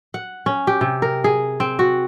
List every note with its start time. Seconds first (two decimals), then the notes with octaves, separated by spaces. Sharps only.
0.14 F#5
0.46 C#4
0.67 G4
0.81 C3
1.02 A#4
1.24 G#4
1.60 C4
1.79 F#4